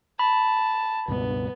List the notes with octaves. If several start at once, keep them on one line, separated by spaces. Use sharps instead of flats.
A5 B5
C#2 G2 B2 B3